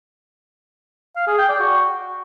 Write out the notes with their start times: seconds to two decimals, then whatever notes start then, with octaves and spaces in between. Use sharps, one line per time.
1.16 F5
1.27 G#4
1.38 G5
1.49 D5
1.60 F#4